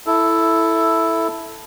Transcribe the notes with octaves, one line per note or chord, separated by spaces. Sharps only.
E4 A4